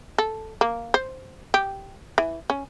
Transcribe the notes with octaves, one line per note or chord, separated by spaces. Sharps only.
A4
A#3
C5
G4
E3
C#4